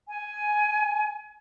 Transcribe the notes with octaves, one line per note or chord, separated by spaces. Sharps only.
G#5